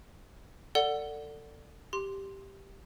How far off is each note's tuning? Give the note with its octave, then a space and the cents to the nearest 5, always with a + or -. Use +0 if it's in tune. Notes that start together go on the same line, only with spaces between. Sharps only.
A4 +25 D5 +0 F#5 +0
G4 +0 C6 +0